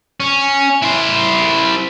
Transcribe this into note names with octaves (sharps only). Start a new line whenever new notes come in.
C#4
E4 C5